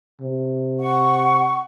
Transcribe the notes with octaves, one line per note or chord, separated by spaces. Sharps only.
C3
F#5 C#6